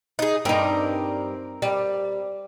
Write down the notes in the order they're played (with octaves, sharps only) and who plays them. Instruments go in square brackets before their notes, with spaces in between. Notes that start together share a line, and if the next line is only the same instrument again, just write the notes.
[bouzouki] D#4 G#4
[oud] G2 D#4 [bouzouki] C4 A#4
[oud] G3